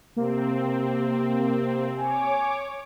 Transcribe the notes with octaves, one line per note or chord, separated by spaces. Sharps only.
C3 A#3 C4
C#5 G#5 D6